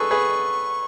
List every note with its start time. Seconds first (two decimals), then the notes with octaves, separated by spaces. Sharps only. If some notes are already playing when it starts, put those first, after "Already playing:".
Already playing: G#4 A4 B4 C#6
0.11 G#4 B4